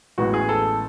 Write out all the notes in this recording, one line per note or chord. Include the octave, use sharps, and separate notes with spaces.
A1 A2 G#3 B3 F#4
G#4
A4